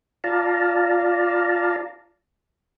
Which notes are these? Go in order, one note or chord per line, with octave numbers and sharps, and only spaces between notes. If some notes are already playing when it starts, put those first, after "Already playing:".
F4 D5 F5 A5 A#5